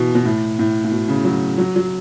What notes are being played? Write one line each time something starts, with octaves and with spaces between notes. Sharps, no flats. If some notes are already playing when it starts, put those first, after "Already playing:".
Already playing: B2 E3
B2
A2
A2
A2
B2
C#3
F#3
F#3
F#3